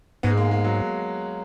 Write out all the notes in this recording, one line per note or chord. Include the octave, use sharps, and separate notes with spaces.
G#2 B3
G#3
A#3
G#3
F#3